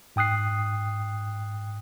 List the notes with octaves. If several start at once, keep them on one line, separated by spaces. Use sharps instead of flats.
G#2 G5 D#6 F#6 C7